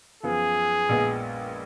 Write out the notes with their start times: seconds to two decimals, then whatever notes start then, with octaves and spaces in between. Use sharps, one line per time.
0.23 F#2 F3 B3 G#4
0.89 A#1 A#2 G#3 B3